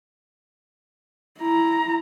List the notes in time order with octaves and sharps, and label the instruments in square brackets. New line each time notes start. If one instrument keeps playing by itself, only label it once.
[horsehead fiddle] E4 A#5